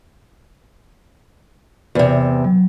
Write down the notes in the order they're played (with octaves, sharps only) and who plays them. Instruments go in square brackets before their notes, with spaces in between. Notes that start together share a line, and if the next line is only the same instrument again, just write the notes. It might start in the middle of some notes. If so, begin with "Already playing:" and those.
[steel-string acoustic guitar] E2 C3
[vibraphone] F#3